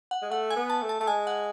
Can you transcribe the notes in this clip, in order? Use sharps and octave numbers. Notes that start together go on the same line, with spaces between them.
F#5
G#3
A3 F#5
G#5
B3
A5
A3
A5
A3 A5
G#3 G#5
F#5